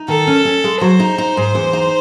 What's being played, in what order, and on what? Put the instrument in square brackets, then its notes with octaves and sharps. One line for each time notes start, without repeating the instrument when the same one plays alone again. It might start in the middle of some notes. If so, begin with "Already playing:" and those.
Already playing: [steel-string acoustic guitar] D#4
[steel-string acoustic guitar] D#3 [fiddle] A4
[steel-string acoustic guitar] C#4
C#4
G#3
[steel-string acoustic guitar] F#3 [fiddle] C5
[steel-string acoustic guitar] D#4
D#4
G#2
E2
D#4